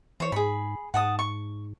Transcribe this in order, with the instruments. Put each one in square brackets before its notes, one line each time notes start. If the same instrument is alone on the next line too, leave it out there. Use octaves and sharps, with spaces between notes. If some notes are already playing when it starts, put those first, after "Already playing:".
[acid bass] E3 [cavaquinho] C5 C#5
[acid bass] G#2 [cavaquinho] G#4 B5
[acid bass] G#2 [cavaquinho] F#5 A5 D#6
[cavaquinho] C#6